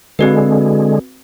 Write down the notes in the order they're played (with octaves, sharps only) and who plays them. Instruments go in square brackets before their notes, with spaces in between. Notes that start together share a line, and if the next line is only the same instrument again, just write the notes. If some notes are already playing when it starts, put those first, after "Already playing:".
[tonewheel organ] D3 G#3 [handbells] C4 F#4 B4